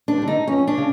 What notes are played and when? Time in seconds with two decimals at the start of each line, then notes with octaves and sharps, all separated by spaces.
0.08 D4
0.17 D3 G3
0.28 D#4
0.47 F2 C#4
0.67 D4
0.77 C#3